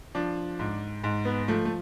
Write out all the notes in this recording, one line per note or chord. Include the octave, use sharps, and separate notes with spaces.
F3 D4
G#2
G#2
B3
F3 A3
A3